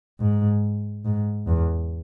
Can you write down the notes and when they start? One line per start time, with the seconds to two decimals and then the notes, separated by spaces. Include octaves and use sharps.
0.20 G#2
1.05 G#2
1.47 E2